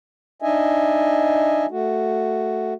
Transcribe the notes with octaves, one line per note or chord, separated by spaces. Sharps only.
D4 D#4 D#5 E5 G#5
A3 F#4